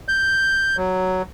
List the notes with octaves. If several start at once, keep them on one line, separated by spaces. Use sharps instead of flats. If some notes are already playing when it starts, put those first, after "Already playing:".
G6
F#3